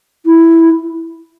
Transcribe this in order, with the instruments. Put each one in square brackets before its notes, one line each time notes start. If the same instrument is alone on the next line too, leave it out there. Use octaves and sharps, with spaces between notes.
[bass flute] E4